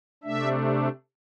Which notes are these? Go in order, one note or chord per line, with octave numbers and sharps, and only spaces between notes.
C3 A3 D4 E5